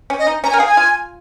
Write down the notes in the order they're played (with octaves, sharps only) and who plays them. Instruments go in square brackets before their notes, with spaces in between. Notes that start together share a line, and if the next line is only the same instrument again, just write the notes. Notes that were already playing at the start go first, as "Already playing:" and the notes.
[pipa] C#4
[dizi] D#5
[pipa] D#4
[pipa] C#4 [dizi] A#5
[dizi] G#5
[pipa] A#4
[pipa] G#4 [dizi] F5
[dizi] G#5
[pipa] F4